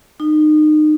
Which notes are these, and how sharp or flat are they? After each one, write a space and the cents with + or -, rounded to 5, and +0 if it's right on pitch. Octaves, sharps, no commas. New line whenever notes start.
D#4 -30